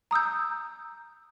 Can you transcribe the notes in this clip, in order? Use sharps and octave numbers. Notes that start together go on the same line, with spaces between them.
A#5 D#6 E6 G6